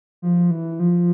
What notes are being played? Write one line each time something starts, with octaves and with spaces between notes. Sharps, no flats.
F3
E3
F3